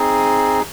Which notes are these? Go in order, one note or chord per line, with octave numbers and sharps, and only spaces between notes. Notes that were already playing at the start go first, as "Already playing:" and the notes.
Already playing: C4 D#4 G#4